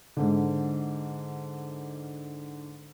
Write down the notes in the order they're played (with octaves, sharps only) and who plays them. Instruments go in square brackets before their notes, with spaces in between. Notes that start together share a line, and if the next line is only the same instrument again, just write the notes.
[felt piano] G#2 D3